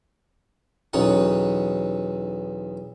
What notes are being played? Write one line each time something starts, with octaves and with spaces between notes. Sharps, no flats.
B1 E2 C#4 D#4 F#5